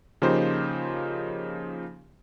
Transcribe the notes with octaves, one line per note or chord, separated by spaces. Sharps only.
C#3 F3 A#3 D#4 G4 C5